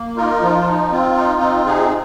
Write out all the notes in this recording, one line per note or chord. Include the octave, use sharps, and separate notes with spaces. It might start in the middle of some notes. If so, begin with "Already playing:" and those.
Already playing: A#3
D#4 F4 A#4
F3 F4
D#4
C4 F4
D#4
C4
C3 D#4 G#4